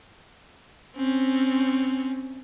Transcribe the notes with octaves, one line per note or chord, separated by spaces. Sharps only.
C4 C#4